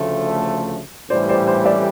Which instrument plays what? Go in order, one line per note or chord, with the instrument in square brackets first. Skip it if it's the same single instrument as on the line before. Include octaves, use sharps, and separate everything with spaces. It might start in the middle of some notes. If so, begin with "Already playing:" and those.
Already playing: [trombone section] D2 C#3 F3 A3
[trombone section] A1 A2 E3 G3 [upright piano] C5 D5
[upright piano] C5 D5
C5 D5
D5 E5